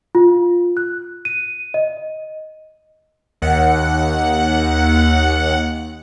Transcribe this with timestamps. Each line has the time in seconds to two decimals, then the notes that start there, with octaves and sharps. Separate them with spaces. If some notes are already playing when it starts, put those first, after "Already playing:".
0.15 F4
0.77 F#6
1.25 D#7
1.74 D#5
3.42 D#2 F#5